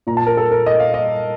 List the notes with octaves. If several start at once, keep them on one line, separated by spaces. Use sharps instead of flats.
A#2 A#5
A5
A#4
A4
A#4
D#5
F5
D#5